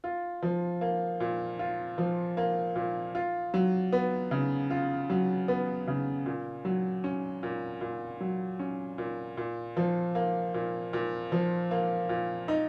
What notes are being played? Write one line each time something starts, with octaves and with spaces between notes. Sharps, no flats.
F4
F3
A#3
A#2
F4
F3
A#3
A#2
F4
F#3
B3
C#3
F4
F#3
B3
C#3
A#2
F#3
C#4
A#2
A#2
F#3
C#4
A#2
A#2
F3
A#3
A#2
A#2
F3
A#3
A#2
D#4